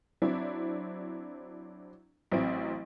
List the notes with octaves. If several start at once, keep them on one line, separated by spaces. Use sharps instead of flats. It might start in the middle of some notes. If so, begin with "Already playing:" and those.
F#3 C4 D4 E4
A1 F#3 C4 E4 D7